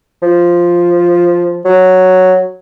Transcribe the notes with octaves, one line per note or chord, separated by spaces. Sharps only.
F3
F#3